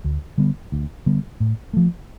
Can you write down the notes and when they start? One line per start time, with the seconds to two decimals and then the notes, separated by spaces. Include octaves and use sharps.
0.04 D2
0.38 D3 G3 B3
0.72 D2
1.06 D3 G3 B3
1.40 A2
1.73 F3 A3